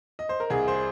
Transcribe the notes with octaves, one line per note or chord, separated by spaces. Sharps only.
D#5
C5
A#4
C2 G#4
C5